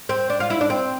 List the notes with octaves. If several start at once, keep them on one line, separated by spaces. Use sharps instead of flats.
C4
D4
F4
E4
D4
C4